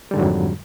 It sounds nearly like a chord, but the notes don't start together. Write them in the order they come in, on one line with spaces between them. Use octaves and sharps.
G3 D3 G#2 F#3 F2